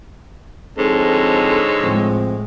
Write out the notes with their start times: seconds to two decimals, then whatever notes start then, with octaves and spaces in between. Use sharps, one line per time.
0.78 F2 G#2 D3 C4 A4 C#5 D#5
1.81 A2 F3 G#3 C4